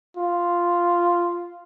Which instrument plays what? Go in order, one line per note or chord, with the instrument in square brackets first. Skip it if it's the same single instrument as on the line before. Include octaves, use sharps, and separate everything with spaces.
[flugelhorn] F4